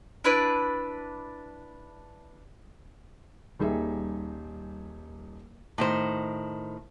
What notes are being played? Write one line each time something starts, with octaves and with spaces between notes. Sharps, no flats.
D4 E4 B4 D5
D#1 G3 D#4 G#4 E5
A2 D#3 C5